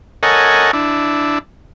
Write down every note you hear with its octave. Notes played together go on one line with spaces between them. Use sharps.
A4 A#4 C#5 D#5 F#5 G#5
D4 E4